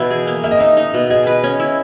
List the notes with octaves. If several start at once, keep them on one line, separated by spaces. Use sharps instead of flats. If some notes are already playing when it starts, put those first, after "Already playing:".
Already playing: B2 E3 E4 E5
G#4
A#3
A#3 E5
D#5
D#4 E5
D#4
B2
G#4 D#5
B4
C#4
E4